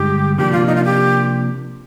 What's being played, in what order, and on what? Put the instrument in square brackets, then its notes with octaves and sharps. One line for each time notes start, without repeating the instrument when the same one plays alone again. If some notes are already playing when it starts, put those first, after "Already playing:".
Already playing: [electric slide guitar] G2 D3 G#3 D#4 [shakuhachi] G4
[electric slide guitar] C3 F3 A#3 D4 [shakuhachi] G4
[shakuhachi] F4
D#4
F4
G4